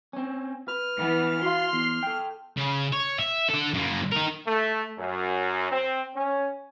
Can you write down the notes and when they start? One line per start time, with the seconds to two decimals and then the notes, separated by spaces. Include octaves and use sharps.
0.13 C4 C#4
0.68 B4 F6
0.98 E3 B3
1.42 F#4 F5 C6
1.73 E2
2.03 A4 G5
2.57 C#3
2.93 C#5
3.20 E5
3.50 D3 A4
3.74 F#2 A#3
4.12 D#4 A#4
4.47 A3
4.99 F#2
5.71 C4
6.16 C#4